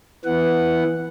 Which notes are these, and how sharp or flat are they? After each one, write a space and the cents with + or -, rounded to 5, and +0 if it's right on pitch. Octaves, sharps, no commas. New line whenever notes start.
E3 +0 B3 +0 F#5 +0